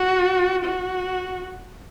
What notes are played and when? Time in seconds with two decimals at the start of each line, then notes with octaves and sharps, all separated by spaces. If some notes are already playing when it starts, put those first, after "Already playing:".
Already playing: F#4
0.64 F#4